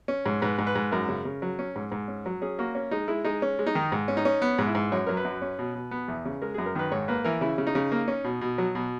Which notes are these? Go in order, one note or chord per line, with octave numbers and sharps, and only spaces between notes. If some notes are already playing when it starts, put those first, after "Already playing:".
C#4
G#2
G#2 B4
G#2
B4
G#2
F#2 A#4
C#3
C#3
F#3
C#4
G#2
G#2
C#4
F#3
C#4 G#4
A#3 F#4
C#4
G#3 D#4
G#3 E4
G#3 D#4
C#4
G#3
D#4
D#3
G#2
C#4
D#4
C#4
B3
G#2
E4
G#2
F#2 C#5
F#3 A#4
B4
F#2
C#4
B2
B2
B3
E2
C#3
G#3 A#4
F#2 G#4
A#4
D#3 B4
G#2 C#5
A#3 B4
E3 A#4
C#3 E4
C#3
D#4
C#3
A#3
C#4
B2
B2
F#3
B2